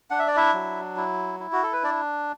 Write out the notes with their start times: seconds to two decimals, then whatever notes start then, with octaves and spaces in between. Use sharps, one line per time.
0.10 D4 F#5
0.19 E5
0.28 D5
0.36 E4 E5
0.54 F#3
0.97 E4
1.40 E4
1.53 F#4
1.63 A4
1.73 B4
1.83 D4 D5